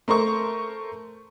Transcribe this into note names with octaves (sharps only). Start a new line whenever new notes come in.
A3 A#4 C5 C#6